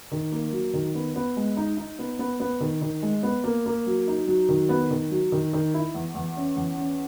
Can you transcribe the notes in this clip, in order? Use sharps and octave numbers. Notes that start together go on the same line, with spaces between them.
D#3
A#3
F#3
D#3
B3
B3
G#3
D#4
D#4
B3
B3
B3
D#3
D#3
G#3
B3
A#3
A#3
F#3
D#4
F#3
D#3
B3
D#3
F#3
D#3
D#3
E4
E2
E2
C#4
E2
C#4